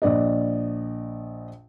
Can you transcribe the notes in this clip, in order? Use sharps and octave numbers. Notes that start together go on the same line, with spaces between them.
A#1 D5 D#5